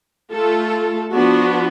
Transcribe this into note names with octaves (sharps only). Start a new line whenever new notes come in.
A3 F4 A4
F3 B3 D4 F#4